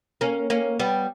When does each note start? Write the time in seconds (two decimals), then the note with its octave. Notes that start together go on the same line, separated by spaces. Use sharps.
0.21 A#3 C#4
0.50 A#3 C#4
0.79 G3 B3